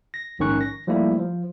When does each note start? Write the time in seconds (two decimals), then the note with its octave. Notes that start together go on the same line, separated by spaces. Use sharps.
0.14 A#6
0.39 A#1 G#2 D#3 C#4 C#6 F#6
0.61 A#6
0.87 F3 G3 A3 A#3 E4
1.19 F3